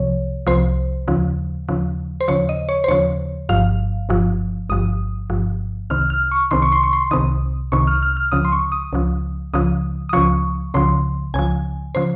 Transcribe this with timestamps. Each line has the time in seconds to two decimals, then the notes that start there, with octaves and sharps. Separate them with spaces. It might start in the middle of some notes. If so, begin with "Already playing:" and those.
Already playing: C2 C3 F3 C#5
0.47 C2 C3 F3 C5
1.08 D#2 C#3 F3
1.69 D#2 C#3 F3
2.21 C5
2.28 D#2 C#3 F3 C#5
2.49 D#5
2.69 C#5
2.84 C5
2.88 D#2 C#3 F3 C#5
3.49 G1 G2 F3 F5
4.09 G1 G2 F3
4.69 G1 G2 F3 D#6
5.30 G1 G2 F3
5.90 C2 C3 D#3 F6
6.10 F6
6.31 C#6
6.51 C2 C3 D#3 C6
6.62 C#6
6.72 C6
6.83 C#6
6.93 C6
7.11 C2 C3 D#3 D#6
7.72 C2 C3 D#3 C#6
7.87 F6
8.03 F6
8.17 F6
8.32 C#2 C#3 F3 D#6
8.45 C6
8.52 C#6
8.72 D#6
8.93 C#2 C#3 F3
9.54 C#2 C#3 F3 D#6
10.09 D#6
10.13 C#2 C#3 F3 C#6
10.74 C#2 C#3 F3 C6
11.34 C#2 C#3 F3 G#5
11.95 C#3 F3 C5